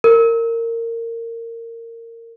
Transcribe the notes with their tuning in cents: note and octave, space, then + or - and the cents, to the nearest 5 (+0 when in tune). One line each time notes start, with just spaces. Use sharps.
A#4 -20